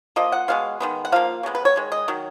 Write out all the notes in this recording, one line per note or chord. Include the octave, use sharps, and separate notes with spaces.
F3 A#3 D#5
F#5
B2 G#3 B3 F5
D#3 G#3 B3
F#5
F3 A#3 F5
C#3 G#3 B3
B4
C#5
D#3 G#3
D#5
D#3 F#3